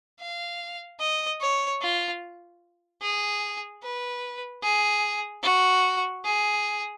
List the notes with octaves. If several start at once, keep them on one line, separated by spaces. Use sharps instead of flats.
F5
D#5
C#5
F4
G#4
B4
G#4
F#4
G#4